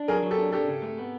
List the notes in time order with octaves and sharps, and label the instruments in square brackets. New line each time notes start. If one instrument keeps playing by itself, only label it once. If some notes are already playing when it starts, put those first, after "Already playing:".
Already playing: [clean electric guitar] D4
[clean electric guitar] F#3 [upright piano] G#4 A#4
[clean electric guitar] F#3
[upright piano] G4 A4
[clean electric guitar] D4
[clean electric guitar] D4 [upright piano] G4 A4
[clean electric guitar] C#3
A3
B3